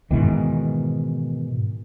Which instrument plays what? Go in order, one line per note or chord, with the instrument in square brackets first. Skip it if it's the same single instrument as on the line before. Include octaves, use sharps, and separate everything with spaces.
[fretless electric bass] G#2 B2 D#3 E3